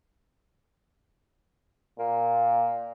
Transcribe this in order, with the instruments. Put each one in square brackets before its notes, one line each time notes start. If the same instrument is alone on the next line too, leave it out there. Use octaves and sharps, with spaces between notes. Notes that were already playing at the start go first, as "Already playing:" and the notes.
[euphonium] A#2 [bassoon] A#3